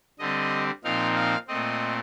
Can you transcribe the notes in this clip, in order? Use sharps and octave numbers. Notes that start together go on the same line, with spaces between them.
D3 G3 C4 D#5
A#2 F3 C4 D#4 F5
F5
A#2 A3 C4 D#5